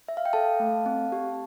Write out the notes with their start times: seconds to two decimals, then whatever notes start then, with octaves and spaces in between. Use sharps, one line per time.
0.08 E5
0.17 F5
0.25 G5
0.33 A4 F5 A5
0.60 A3
0.86 C4
1.12 G4